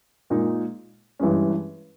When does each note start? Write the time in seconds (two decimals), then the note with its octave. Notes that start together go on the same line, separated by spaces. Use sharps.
0.30 A#2 G#3 D#4
1.19 G2 E3 G#3 C#4